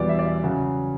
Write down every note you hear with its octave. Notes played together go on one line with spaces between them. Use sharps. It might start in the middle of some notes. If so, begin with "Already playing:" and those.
Already playing: E2 B2 G3 D5
E5
D5
E5
C#3 F#3 F#5